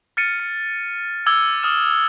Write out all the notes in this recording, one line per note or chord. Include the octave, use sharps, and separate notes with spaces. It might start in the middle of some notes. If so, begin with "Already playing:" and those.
F6 A6 C#7 D#7
C#7
D6 E6 G#6 G7
D#6 F6 E7